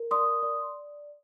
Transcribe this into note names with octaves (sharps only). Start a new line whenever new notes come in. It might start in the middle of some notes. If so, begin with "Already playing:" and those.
Already playing: A#4
D5 C6 D#6
D5